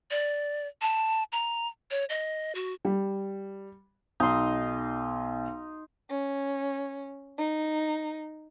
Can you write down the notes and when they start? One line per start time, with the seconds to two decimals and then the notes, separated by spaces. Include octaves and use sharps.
0.11 D5
0.81 A5
1.32 A#5
1.91 C#5
2.09 D#5
2.55 F#4
2.85 G3
4.20 B1 D#4 C6
6.10 C#4
7.38 D#4